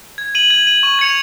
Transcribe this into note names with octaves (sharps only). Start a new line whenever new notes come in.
G#6
D#7 F#7
G#6
D#7 F#7
C#6
G#6 C#7 F7